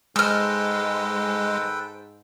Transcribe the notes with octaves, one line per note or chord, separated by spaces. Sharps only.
G#2 G#3 A4 B4 G5 E6 F6